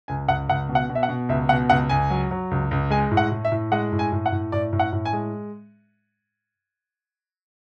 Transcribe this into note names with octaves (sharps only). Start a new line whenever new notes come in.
C#2 G#5
C#2 F#5
C#2 F#5
B2
F#5
B2
E5
F#5
B2
C#2 E5
B2 F#5
C#2 F#5
C#2 G#5
F#3
F#3
C#2
C#2
G#3 G#5
A2
F#5
A2
E5
A2
G#3 F#5
A2
G#5
A2
F#5
A2
A2 D5
A2
F#5
A2
G#5
G#3